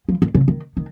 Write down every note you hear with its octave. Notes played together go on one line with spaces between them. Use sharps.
F3
D#3
C#3
D#3
D#3